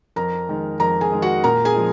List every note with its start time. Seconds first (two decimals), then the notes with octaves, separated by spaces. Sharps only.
0.16 F2 A#4 A#5
0.48 D#3 G#3
0.79 F2 A#4 A#5
1.01 G#4 G#5
1.12 D#3 G#3
1.22 F#4 F#5
1.44 A#2 A#4 A#5
1.65 G#4 G#5
1.75 F3 G#3